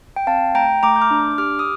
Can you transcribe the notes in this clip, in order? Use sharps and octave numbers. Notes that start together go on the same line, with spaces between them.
G5
C4 F5 A5
A3 G5 A#5
A3 A#5 D6
G6
D6 F6
D4
G4 D6 F6
D#6